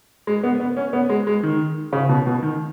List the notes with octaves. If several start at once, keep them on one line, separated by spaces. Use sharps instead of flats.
G#3
B3
B3
C#4
B3
G#3
G#3
D#3
C#3
B2
B2
D#3